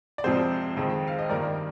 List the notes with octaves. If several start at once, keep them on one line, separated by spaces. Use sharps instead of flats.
D5
F2 C3 F3 G#3 C4 G#4 C5
F2 D#3 G#3 C4
F5
D#5
G2 D#3 A#3 A#4 D5